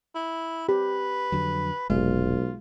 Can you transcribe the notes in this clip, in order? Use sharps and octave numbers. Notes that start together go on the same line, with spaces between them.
E4
G4 B4
F2 D3 F#3
F1 B1 G#3 F4